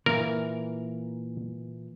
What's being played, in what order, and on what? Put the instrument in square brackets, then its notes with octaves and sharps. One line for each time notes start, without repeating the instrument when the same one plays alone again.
[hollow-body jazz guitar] A#2 E3 A#3 [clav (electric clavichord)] A#4